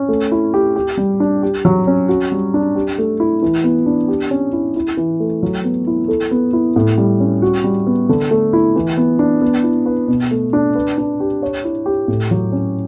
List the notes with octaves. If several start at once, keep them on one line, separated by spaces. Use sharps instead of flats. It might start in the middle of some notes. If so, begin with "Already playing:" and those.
Already playing: C#4
A3
E4
G4
G4
G3
D4
G4
F#3
C#4
F#4
G3
D4
G4
A3
E4
E3
B3
D4
G4
C#4
E4
E4
E3
A3
F#3
B3
E4
A4
B3
E4
A2
G3
C#4
F#4
G3
B3
D3
A3
E4
E3
B3
D4
B3
E4
B4
B2
A3
D4
B4
D4
G4
C#5
E4
G4
A2
F#3
C#4